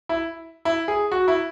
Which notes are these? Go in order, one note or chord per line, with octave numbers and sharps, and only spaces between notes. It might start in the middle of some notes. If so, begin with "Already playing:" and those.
E4
E4
G#4
F#4
E4